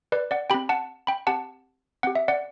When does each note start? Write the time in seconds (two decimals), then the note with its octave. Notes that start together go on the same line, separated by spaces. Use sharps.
0.12 B4 D5
0.31 D5 F#5
0.50 G4 G5 B5
0.54 C4
0.69 F#5 A5
1.07 G5 B5
1.27 C4 G4 F#5 A5
2.03 C4 G4 F#5
2.15 E5
2.28 D5 F#5